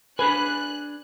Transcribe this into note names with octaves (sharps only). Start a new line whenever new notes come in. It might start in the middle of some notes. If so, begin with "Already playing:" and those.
D4 G#4 B4 G#5 F#6